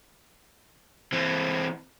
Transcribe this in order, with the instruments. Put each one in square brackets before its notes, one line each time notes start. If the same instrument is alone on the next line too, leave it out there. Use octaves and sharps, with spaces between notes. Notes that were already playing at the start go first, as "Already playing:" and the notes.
[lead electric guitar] E3 C4